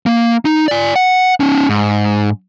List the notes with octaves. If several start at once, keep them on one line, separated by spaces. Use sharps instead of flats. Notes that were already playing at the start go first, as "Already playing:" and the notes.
A#3
D#4
D5 G#5
F#5
C#4 D#4
G#2